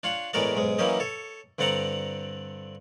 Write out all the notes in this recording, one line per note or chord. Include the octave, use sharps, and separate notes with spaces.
D4 F4 C#5 F#5
E2 A2 G#3 F#4 A#4 D5
B1 G#2 G#3
E3 F#3 A#3 C#4 G4 D#5
A4 C#5
G2 D3 C4 D5 F#5 A#5